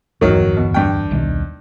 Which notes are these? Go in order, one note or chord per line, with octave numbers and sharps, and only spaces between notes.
D1 G1 E2 D#3 F#3
B2
G2 G5
D#1 B1 D#3